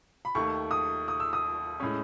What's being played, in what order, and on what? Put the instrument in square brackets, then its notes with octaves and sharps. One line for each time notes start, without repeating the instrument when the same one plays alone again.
[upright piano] B5
D#2 D#3 A3 C#6
D#6
D#6
E6
D#6
A2 G#3 C#4